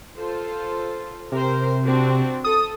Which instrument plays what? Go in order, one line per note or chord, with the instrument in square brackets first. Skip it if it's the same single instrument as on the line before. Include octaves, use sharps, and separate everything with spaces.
[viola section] F4 A4 C5
[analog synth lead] C3 [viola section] A#4 C5
[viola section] C4 D4 F#4
[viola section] A4 [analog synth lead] D#6